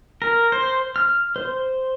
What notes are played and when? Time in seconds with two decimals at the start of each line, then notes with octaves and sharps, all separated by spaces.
0.22 A#4
0.52 C5
0.96 F6
1.36 C5